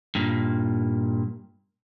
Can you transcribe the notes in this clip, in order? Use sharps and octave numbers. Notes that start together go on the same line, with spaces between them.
G2 A#2